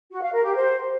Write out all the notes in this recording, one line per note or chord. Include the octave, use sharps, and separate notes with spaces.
F#4
F5
A#4
G4
C5